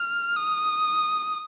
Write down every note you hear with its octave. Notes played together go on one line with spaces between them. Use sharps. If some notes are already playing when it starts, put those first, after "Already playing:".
Already playing: F6
D#6